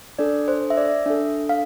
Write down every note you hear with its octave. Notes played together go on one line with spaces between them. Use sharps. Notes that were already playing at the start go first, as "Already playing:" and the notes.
D4 A4 D5
C5
E5
D5
D4 A4 E5
F5